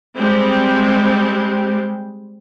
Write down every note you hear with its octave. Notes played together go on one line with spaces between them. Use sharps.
G3 G#3 C4